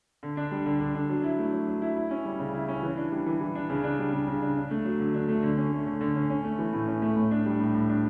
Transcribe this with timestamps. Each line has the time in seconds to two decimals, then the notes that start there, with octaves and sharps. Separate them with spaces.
0.23 D3
0.37 D4
0.51 G3
0.66 D3
0.80 D3
0.95 D4
1.09 F#3
1.24 E4
1.39 A3
1.53 F#3
1.67 F#3
1.82 E4
1.96 E4
2.11 C#4
2.25 G3
2.39 C#3
2.55 E4
2.68 C#4
2.83 E3
2.97 D4
3.12 G3
3.26 E3
3.41 E3
3.55 D4
3.70 C#3
3.84 D4
3.99 G3
4.13 C#3
4.27 C#3
4.42 D4
4.57 D4
4.71 A3
4.85 F#3
5.00 D3
5.14 D4
5.29 A3
5.43 D3
5.57 C#4
5.72 A3
5.86 D3
6.01 D3
6.15 C#4
6.30 C#4
6.44 A3
6.59 E3
6.73 A2
6.88 C#4
7.02 A3
7.16 A2
7.31 D4
7.46 G3
7.60 A2
7.75 A2
7.90 D4